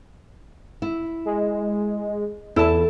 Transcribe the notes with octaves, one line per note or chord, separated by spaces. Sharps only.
E4
G#3
E2 E4 A4 A5